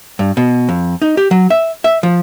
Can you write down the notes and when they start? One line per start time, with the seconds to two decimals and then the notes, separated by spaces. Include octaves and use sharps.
0.19 G2
0.37 B2
0.69 F2
1.02 D#4
1.17 G4
1.31 F#3
1.50 E5
1.84 E5
2.03 F3